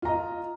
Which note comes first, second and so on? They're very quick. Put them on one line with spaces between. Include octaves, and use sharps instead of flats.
F4 A#5 D#5